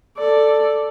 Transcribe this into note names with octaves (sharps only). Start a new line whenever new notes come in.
A4 D5